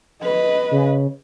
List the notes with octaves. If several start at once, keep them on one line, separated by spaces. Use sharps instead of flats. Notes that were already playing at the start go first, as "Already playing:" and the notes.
B4 D#5
C#3